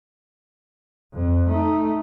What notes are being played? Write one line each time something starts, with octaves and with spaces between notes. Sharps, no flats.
F2
A3 D#4